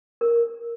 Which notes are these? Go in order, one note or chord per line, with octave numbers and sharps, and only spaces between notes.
A#4